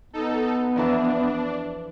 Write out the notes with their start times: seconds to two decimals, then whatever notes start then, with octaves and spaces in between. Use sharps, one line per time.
0.13 B3 D#4 A4
0.76 F2 E3 D4 A5